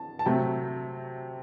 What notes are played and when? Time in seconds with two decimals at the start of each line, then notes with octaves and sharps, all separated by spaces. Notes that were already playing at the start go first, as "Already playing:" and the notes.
Already playing: A5
0.19 A5
0.26 C3 F#3 A3 G5